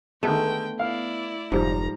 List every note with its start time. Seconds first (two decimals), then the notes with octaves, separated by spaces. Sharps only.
0.23 D3 D#3 G#3 A3 B3 G5
0.79 E4 D5 F5
1.52 F1 G#2 F3 G3 A#5